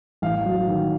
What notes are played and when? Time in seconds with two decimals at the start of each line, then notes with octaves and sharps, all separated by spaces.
0.22 A1 F5
0.45 F#3
0.68 D#3